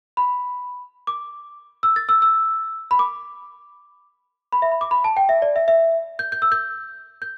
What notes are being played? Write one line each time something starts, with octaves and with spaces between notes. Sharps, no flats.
B5
D6
E6
A6
E6
E6
B5
D6
B5
E5
B5
D6
B5
A5
G5
E5
D5
E5
E5
G6
G6
E6
G6
G6